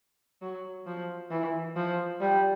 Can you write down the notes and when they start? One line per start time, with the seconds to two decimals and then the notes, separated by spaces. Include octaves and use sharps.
0.42 F#3
0.87 F3
1.31 E3
1.76 F3
2.20 G3